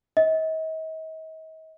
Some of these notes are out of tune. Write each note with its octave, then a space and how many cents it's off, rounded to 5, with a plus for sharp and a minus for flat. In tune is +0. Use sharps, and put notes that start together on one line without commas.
D#5 +40